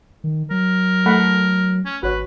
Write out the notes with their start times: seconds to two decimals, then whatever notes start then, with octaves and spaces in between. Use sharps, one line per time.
0.24 D#3
0.51 F#3 A#4
1.06 A3 F#5 B5
1.85 C#4
2.03 G#1 F#4 B4 C#5